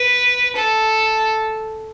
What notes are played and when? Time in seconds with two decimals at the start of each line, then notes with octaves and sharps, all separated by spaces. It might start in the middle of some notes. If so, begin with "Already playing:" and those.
Already playing: B4
0.56 A4